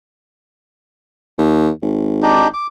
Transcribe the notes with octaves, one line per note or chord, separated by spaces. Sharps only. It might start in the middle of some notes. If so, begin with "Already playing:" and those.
D#2
G#1
D4 D#4 G4
D6